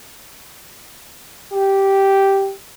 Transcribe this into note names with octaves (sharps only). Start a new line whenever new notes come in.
G4